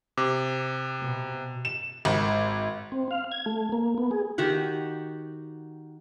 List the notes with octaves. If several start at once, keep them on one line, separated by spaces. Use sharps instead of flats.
C3 D6
B2
E7
G#1
C4
F5
G#6
A3
A#3
B3
G#4
D#3 F#4 G4 F#5